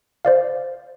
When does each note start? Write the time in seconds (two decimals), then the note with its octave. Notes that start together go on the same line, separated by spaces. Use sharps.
0.25 C5 D5 F5